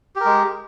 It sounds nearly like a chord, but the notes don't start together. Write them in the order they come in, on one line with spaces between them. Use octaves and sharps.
G4 A#4 G#3